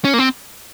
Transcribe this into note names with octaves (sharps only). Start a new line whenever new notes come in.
C#4
A#3
C4